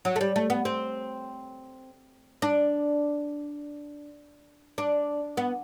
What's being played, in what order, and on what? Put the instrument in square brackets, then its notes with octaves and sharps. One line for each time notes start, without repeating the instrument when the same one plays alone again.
[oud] F#3
A3
G3
A3
B3
C4
D4
D4
B3